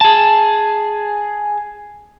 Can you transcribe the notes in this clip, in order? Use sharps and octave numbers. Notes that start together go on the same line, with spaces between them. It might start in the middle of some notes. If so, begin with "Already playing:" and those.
G#4 A5